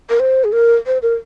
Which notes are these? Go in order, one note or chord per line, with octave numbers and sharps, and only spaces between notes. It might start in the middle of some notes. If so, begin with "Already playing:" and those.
A#4
C5
G#4
A#4
C5
A#4